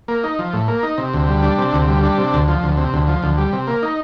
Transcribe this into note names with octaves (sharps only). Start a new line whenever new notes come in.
A#3
D#4
F3
A2
A#3
D#4
C3
D2
G3
D4
C3
D2
G3
D4
C3
D2
F3
D2
C3
D2
F3
D2
G3
C3
A#3
D#4